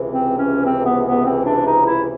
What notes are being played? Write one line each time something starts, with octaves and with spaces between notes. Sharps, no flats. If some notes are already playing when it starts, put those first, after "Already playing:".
Already playing: C#2 C3 E3
C4
C#4
C4
B3
B3
C4
D4
D#4
E4